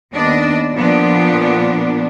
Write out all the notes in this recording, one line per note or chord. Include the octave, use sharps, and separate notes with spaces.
D#2 B3 D4 D5 D#5
A#2 F3 B3 D4